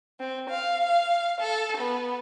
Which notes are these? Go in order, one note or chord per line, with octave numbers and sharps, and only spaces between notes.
C4
F5
F5
A4
B3